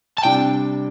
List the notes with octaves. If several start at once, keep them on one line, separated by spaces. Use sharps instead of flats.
A5
C3 G3 D4 G5